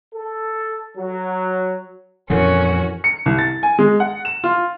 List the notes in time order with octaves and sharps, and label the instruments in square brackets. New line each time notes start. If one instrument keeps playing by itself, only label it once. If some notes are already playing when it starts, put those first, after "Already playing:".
[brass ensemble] A4
F#3
[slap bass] F2 A#2 E3 [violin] C#4 F#4 [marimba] A4 A#4 F#5
[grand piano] C#7
C2
A6
G#5
G#3
F#5
E7
F4